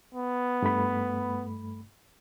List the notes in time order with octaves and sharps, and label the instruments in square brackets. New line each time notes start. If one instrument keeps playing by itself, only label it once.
[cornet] B3
[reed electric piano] G2 A3 B5